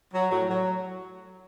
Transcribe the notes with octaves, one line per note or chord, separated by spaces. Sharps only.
F#3
A2 F#3
F#3